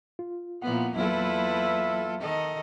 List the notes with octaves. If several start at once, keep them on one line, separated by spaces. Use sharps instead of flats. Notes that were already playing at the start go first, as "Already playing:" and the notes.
F4
A#2 F3 B3 E4 F#5
E2 F#3 A#3 E4 F4 A4 B4 E5
D#3 A4 D#5